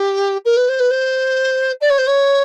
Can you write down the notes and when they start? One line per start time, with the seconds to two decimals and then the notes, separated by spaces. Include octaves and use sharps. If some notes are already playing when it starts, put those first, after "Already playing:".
Already playing: G4
0.45 A#4
0.56 B4
0.68 C5
0.79 B4
0.90 C5
1.81 D5
1.89 C#5
1.98 C5
2.06 C#5